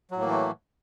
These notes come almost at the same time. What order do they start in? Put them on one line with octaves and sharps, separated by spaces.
F#3 A2 A#3 E3 A3